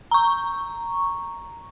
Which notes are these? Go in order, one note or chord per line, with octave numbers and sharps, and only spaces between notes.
A#5 C#6